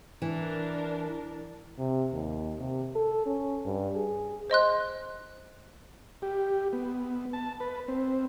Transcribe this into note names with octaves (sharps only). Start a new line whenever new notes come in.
E3 D4 A#4
C3
D#2
C3
A4
C#4
G2
G#4
C5 D#5 C6 F#6
G4
B3
A5
B4
C4